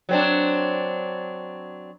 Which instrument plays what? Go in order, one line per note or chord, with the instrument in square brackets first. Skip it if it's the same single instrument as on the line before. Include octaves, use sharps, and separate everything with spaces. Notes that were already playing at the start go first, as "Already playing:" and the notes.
[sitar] F#3 C4 D4